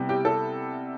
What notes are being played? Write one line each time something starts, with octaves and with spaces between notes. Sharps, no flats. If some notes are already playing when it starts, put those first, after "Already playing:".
Already playing: C3 G3 B3 E4
G4
A4